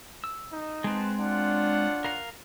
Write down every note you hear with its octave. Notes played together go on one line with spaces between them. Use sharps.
E6
D#4
G#3 C4 B4 F#5 A5
D4 F4 C#5 F#5
A#4 F5 A#5